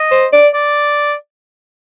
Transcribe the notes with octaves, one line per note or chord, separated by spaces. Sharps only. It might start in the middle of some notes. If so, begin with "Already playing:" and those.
Already playing: D#5
C5
D5
D5